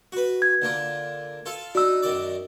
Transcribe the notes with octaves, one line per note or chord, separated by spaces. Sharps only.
F#4 B4
G#6
D3 A#3 F4
F4 A4 F5
D4 D#4 F#4 E6
F#2 D#3 D5